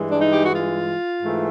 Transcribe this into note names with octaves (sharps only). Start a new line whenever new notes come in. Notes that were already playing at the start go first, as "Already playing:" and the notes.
Already playing: G2 E3 G#3
D4
D#4
G4
F#4
F4
G#2 E3 A3